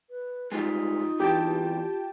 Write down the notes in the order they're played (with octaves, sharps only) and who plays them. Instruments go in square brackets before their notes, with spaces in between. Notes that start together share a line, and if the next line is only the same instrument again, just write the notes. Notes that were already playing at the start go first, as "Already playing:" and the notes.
[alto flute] B4
[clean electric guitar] F2 G3 G#3 [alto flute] D#4 [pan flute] F4
[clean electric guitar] E2 G2 E3 [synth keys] G4 G5 A5